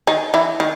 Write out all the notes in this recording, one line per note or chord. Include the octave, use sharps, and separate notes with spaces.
D#3 D#4
E3 E4
D#3